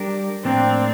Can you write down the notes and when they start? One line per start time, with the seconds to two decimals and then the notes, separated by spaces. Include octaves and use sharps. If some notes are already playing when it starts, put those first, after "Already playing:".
Already playing: G3 D4 G4 A#4
0.44 A2 F3 A#3 C4 D4